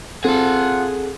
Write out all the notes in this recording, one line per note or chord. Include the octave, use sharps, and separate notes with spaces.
C4 F4 G#4 A4 F#5 A5